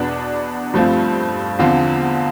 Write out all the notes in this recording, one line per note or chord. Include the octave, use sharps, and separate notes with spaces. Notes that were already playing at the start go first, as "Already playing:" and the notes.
Already playing: E2 B2 B3 D4
G2 F3 A3 C4 F4
E2 D3 F3 C4 F4